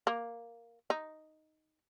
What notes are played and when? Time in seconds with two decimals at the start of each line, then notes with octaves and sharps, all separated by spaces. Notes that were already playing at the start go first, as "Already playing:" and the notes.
0.07 A#3
0.90 D#4